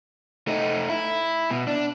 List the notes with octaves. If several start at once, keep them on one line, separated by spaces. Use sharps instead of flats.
A3 D#4
E4
B2
D4